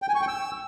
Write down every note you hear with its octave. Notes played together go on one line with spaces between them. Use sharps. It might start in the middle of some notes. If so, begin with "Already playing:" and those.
G5
G#5
C#6
G5
E6